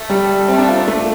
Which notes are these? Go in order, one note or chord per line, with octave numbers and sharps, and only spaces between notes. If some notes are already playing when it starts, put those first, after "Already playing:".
Already playing: A3
G3
A3 C4
D4
F4
D4
A3